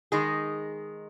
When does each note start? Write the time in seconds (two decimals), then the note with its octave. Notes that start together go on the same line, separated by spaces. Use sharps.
0.12 D#3 G#3 D#4 G#4